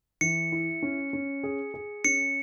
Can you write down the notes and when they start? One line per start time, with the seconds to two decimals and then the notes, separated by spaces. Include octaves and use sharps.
0.21 E3 C#7
0.52 E4
0.83 C#4
1.13 C#4
1.43 G#4
1.74 G#4
2.04 C#4 C#7